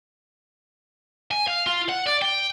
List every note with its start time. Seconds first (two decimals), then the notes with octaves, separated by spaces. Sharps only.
1.31 G#5
1.47 F5
1.66 F4
1.89 F#5
2.07 D5
2.22 G5